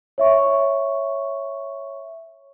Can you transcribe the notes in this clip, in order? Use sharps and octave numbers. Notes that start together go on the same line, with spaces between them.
C#5 E5 C#6